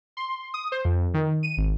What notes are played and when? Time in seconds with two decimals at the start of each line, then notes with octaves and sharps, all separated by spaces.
0.17 C6
0.54 D#6
0.72 C5
0.85 F2
1.14 D#3
1.43 D#7
1.57 G#1